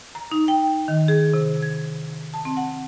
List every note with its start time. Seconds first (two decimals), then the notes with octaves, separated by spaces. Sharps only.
0.15 A#5
0.32 D#4
0.48 G5
0.88 D#3
1.08 G#4
1.34 C3
1.62 G#6
2.34 A5
2.45 C4
2.57 F#5